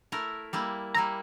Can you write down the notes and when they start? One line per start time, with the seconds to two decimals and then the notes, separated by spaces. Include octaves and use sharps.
0.12 A3 E4 A#4
0.53 G3 A#3 E4
0.95 G3 A#3 E4 A#5